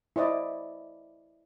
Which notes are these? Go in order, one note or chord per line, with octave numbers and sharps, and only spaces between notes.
E4 C5 D5 D#5